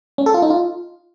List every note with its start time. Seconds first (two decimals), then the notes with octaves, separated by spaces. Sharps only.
0.18 C#4
0.26 A4
0.34 F4
0.42 D#4
0.50 F4